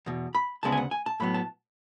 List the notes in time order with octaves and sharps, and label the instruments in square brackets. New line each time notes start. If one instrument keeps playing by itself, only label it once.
[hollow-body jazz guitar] E2 B2
B5
D2 C#3 G#3 B3 A5
G#5
F#5
G#5
A5
A2 F#3 B3 B5
A5